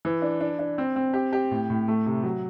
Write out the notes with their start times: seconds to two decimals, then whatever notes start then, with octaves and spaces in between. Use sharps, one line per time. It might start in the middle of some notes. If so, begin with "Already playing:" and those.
0.05 E3
0.22 D4
0.41 D4
0.59 D4
0.78 C4
0.96 C4
1.14 G4
1.33 G4
1.51 A2
1.70 A2
1.88 A3
2.06 C3
2.24 F#3